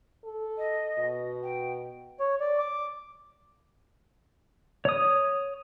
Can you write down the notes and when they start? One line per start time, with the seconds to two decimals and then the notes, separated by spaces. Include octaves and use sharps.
0.24 A4
0.58 D#5
0.98 B2
1.43 G5
2.20 C#5
2.40 D5
2.59 D6
4.85 C#5 D#6